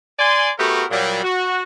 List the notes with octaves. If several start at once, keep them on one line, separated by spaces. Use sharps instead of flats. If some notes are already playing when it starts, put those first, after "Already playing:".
D5 G#5 C6
A3 B3 F#4 G4 A#4 B4
A#2 F#3 G3
F#4